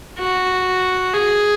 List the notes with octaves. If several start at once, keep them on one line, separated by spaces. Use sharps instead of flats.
F#4
G#4